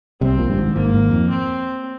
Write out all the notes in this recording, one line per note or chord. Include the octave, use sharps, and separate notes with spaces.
C2 C3 C4
A#1 A#2
G2
G#1 G#2
G#1 G#2 A#3
G#1 G#2
F2
C4